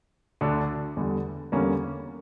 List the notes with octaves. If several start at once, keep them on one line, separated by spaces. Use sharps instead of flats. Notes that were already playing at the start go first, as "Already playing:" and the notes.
D2 D3 A3 D4
E2 D3 G3
E2 D3 G3 A#3 C#4